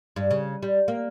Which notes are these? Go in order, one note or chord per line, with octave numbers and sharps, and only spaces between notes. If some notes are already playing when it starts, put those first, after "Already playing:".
G2
C#3
G3
A#3